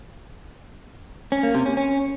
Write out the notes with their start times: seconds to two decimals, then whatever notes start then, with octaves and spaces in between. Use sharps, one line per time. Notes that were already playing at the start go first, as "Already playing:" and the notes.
1.32 C#4
1.43 A#3
1.55 C3
1.66 C#4
1.77 C#4